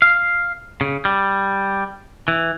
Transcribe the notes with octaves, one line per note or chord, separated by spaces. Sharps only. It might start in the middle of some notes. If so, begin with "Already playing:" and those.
F5
C#3
G3
E3